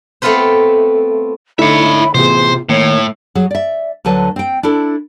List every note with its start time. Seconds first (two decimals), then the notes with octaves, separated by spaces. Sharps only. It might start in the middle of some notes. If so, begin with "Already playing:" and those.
0.22 A3 B3 C4 F4 B4 C5
1.59 D3 A3 D#4 E4 C#5 E5 B5
2.14 A1 C3 B3 F4 G#4 C5
2.69 A2 D#3 A#3 C#5
3.35 F#3 G#4
3.51 D5 E5
4.05 D2 D3 F#3 B4 A5
4.36 C4 G5
4.63 D4 E4 A4